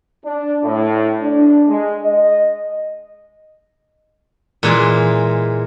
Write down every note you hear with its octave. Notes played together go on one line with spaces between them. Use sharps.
D4
A2
D4
G#3
D#5
A#2 E3 G#3